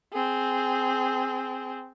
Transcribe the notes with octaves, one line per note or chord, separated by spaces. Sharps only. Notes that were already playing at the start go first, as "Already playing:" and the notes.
C4 G#4